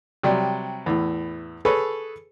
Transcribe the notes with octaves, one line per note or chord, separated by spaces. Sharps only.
C3 F#3 G3
E2 A2
G#4 A4 B4 C#5